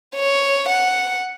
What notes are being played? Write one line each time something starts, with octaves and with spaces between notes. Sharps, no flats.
C#5
F#5